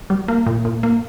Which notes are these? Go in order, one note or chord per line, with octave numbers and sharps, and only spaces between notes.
G3
A#3
A#2
A#2
A#3